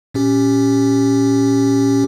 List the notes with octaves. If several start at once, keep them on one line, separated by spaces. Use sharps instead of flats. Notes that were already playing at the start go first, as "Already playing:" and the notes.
A#2 C#4 G4